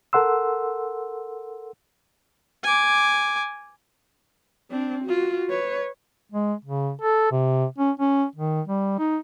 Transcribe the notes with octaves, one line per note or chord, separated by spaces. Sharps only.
A4 A#4 F#5 C6 E6
G#5 D6
C4 D4
F4 F#4
B4 C#5
G#3
C#3
A4
C3
C#4
C#4
D#3
G3
D#4